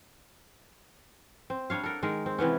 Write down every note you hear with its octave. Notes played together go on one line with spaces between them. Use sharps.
C4
G3 D4 C#5 F5
A4 A#4 F#5
D#3 G#3 A#4
C4
C3 E3 B3 C#4